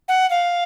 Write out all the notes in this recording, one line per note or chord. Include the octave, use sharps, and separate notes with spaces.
F#5
F5